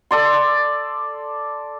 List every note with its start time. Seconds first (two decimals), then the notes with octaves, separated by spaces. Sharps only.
0.11 A4 D5 C6